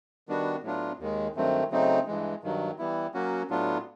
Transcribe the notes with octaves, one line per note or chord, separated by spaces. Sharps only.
D#3 G3 B3 D4 F#4
A2 F#3 B3 D4 F4
D#2 D#3 G#3
G2 D#3 F#3 A3 C4
C#3 F#3 A3 C4 D#4
G2 E3 G#3
G2 D#3 F#3
E3 G3 B3 E4
F#3 A#3 C#4 F#4
A2 F#3 B3 D4 F4